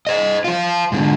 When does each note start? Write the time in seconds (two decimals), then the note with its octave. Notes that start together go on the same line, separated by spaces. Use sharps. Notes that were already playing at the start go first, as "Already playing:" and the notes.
0.07 C5 D#5
0.44 F4 C5
0.92 G#2 D3